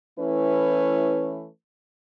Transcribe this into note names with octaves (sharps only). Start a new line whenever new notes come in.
E3 A3 C#4 E4 B4